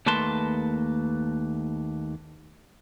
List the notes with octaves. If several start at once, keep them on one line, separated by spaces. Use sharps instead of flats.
D#2 A3 A#3 B4 A5 C6